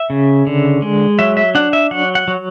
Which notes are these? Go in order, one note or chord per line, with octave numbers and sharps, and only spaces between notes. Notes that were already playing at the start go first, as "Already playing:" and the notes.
Already playing: E5
C#3
D3
G#3
F#3 E5
E5
D4 F#5
E5
F#3 F#5
F#5
F#3